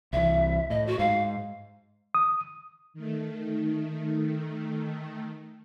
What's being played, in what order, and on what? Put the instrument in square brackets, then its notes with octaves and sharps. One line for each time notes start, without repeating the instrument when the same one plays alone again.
[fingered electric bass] C2 E3 [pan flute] E5
[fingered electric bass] A2 [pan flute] D#5
[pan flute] F#4
[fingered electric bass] G#2 [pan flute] F5
[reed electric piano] D#6
[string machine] D#3 A3